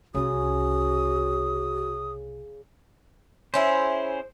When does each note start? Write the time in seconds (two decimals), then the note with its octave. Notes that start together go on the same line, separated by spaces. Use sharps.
0.15 C2 C#3 F#4 D#6
3.54 C#4 E4 G#4 C5